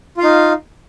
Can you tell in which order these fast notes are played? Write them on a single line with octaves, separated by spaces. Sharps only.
F4 F5 D#4